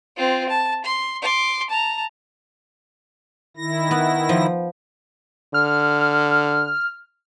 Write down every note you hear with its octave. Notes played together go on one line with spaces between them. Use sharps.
C4 F4
A5
C6
C6 D6
A5 A#5
D#3 E4 A#6
B3
F3
D3 F6